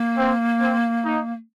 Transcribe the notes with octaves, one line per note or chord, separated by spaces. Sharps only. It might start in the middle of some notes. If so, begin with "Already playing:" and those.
Already playing: A#3
C4
C4
D#4